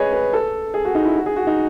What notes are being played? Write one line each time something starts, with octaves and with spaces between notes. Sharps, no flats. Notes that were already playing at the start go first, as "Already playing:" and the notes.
Already playing: G#4 B4 C#5 D#5
B4
A4
G#4
F#4
D#4
E4
F#4
G#4
F#4
D#4